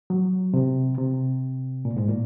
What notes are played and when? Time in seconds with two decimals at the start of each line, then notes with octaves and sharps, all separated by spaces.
0.10 F#3
0.54 C3
0.98 C3
1.85 A#2
1.96 G#2
2.08 A#2